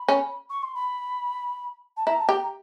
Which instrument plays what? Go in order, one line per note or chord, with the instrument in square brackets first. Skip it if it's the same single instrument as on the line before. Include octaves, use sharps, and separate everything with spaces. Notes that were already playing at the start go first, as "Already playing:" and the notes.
Already playing: [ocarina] B5
[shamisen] C#4
[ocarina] C#6
C6
B5
A5
[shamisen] E4 [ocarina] A#5
[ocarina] A5
[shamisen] G4 [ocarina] A#5